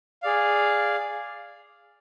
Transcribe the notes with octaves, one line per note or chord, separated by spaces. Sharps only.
G#4 D5 F5